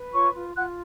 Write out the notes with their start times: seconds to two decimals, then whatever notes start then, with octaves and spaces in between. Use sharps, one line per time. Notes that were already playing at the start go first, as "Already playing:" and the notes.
Already playing: B4
0.11 F4 C#5 C#6
0.33 F4
0.55 F4 F#5 F#6